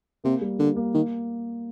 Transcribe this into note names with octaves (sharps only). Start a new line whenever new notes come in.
C3 A#3
G3
D3 A#3
A#3
D#3 A#3